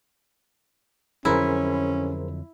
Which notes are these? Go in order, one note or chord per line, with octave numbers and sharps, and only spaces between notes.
F2 D3 F#3 C#4 E4 G#4 A#4 C5